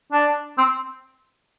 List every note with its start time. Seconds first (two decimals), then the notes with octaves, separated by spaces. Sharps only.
0.12 D4
0.57 C4